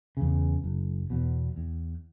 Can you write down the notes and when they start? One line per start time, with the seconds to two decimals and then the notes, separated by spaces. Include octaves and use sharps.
0.17 E2 C#3
0.64 F#1
1.10 E2 B2
1.56 E2